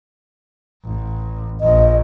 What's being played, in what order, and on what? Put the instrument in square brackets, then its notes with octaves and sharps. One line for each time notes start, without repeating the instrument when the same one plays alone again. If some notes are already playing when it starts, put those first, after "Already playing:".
[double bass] A1
[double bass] A#1 [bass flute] D#5